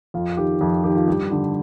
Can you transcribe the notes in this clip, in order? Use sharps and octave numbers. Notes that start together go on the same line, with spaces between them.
F2 F4
D#3 G4
F2 F4
D#3 G4
F4
G2 G4
D3